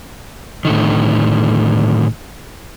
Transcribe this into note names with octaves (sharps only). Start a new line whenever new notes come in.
A2 D3 D#3